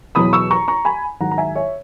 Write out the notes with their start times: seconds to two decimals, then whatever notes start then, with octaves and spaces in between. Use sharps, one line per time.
0.15 E2 B2 F#3 B5 D#6
0.33 C#6 E6
0.51 A#5 C#6
0.68 A#5 C#6
0.85 G#5 B5
1.20 G#2 D#3 F#3 F#5 A#5
1.31 A#5
1.38 E5 G#5
1.56 C#5 E5